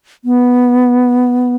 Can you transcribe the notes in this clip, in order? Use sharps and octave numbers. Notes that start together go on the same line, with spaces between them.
B3